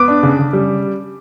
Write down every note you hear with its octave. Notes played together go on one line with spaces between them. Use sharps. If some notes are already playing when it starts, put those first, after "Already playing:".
Already playing: B3 D6
D4
C#3
C#3
G3